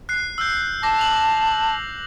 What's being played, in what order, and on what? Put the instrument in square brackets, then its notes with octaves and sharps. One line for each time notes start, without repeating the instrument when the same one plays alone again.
[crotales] F#6 C7
E6 F6 G6
[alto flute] A5 [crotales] D6 A#6
[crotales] F7 F#7